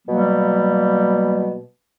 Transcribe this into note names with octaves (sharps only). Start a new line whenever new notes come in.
B2 F#3 G3 A#3